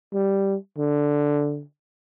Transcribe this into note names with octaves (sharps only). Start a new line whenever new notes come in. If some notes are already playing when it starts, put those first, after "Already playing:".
G3
D3